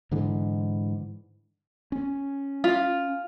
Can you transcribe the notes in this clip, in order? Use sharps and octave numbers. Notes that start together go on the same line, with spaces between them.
G#2 D3 E3
C#4
F4